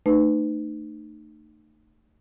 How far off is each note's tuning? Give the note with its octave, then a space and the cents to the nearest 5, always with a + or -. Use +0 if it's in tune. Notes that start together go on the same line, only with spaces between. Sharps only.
A3 +25 D#4 -35 B4 +25